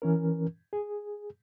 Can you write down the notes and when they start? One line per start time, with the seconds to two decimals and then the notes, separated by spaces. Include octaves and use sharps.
0.02 E3 C#4 A#4
0.73 G#4